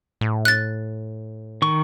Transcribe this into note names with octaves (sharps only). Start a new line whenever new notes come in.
A2
F#6 A6
D#3 C#6